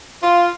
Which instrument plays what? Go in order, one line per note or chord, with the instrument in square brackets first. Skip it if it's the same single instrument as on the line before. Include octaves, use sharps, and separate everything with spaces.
[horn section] F4